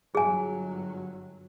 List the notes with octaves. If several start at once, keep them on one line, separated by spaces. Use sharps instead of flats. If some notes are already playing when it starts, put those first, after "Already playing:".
G1 F#3 G#4 G#5